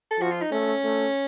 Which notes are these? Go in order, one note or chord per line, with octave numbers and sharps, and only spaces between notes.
A4
F3 F#4
F4
D#4
A3 C#4
A3